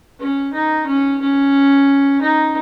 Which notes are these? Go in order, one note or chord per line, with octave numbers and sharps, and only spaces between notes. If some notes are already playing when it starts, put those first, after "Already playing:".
C#4
D#4
C#4
C#4
D#4